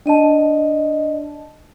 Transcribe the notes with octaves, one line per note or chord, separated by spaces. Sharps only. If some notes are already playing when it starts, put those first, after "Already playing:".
D4 D5 D#5 A5